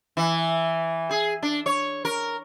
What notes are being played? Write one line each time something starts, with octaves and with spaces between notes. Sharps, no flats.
E3
G#4
D4
C#5
A#4